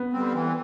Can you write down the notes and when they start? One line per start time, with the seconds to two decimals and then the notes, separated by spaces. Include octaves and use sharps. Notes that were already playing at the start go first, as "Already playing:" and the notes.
Already playing: B3
0.13 D3 G3 C4
0.33 E3